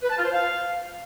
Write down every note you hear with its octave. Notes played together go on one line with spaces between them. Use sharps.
B4
A5
F4
C5
F5